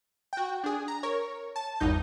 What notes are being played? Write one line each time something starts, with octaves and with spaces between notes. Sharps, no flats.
F#4 G5
D4 G#4
A#5
A#4 C#5
A5
G#1 E2 G2 D#4 G6